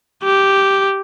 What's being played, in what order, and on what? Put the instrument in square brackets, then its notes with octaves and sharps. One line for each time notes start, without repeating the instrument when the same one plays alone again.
[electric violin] G4